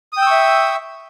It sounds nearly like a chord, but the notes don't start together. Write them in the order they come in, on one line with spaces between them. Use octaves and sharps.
D#6 G5 E6 C#6 E5